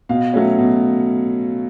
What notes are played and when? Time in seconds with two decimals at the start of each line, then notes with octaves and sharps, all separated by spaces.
0.09 B2 F5
0.34 F#3 A3 C#4
0.58 B2